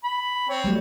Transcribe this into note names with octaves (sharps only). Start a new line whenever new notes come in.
B5
C4 C#5
F#3 G3 A3